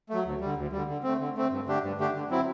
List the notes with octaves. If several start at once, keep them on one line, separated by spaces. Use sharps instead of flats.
F#3 A3
D2
D3 G3
D2
D3 G3
D3
A3 C4
D3
A3 C4
G2
D3 A3 D4 G4
G2
D3 A3 D4 G4
D3
F#3 C4 E4